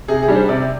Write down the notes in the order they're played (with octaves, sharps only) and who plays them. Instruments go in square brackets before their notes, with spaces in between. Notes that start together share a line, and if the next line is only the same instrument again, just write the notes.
[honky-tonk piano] C3 [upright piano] G#4
[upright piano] G#4
[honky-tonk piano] G3 D4
[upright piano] C5
[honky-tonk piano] C3 [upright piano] D5